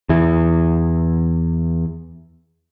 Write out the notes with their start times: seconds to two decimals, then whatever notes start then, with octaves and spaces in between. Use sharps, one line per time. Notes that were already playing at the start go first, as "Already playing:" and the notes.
0.09 E2 E3